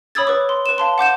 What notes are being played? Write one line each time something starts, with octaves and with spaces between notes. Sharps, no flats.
C#5 B5 D#6 E6 G#6 A6
B4 C#5 D6
C6
B4 E7
F5 A5 C6
F#5 D6 G6 E7